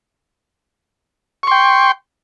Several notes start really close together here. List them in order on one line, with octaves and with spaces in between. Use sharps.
C#6 C6 G5